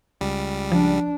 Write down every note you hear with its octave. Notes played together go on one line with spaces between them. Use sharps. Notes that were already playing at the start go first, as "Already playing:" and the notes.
C#2 G3
F3 D4